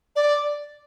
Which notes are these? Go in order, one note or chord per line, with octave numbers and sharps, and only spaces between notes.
D5